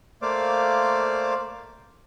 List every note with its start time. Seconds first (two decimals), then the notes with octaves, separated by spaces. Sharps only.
0.22 A3 A#3 C5 D5 F5 D6